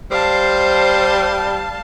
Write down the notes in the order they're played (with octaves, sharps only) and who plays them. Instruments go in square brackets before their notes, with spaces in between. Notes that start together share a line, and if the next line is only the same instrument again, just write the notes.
[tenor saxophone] G3 [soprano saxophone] C5 [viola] F5 A5